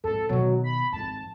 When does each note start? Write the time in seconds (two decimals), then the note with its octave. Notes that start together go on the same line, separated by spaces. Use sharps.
0.04 F2 G#2 A4
0.29 B2 D#3 F#3
0.64 B5
0.92 G#1 F2 A5